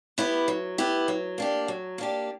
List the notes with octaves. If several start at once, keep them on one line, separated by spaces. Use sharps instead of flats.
B3 E4 G4
F#3
B3 E4 G4
F#3
A#3 D4 G4
F#3
A#3 D4 G4